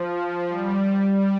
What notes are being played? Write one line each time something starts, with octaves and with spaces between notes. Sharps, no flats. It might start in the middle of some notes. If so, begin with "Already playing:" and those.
Already playing: F3
G3
G3